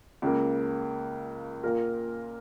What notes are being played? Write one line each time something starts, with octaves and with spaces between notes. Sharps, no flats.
C#2 C#3 A#3
A#2 A#3 F4 A#4